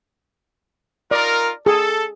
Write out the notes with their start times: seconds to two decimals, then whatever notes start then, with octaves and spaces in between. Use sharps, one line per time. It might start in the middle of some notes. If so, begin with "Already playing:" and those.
1.11 D#4 F4 A#4 D5
1.66 G#4 A4